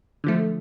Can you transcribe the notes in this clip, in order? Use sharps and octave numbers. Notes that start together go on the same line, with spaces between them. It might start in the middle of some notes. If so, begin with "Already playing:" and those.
D3 F3 A3